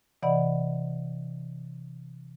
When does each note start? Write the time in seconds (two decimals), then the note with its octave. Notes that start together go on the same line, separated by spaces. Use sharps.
0.23 C3 E3 D5 D#5 F#5 B5